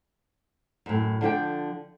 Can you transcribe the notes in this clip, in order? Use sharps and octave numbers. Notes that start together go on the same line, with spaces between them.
F#2 A2
D3 F3 D5 G5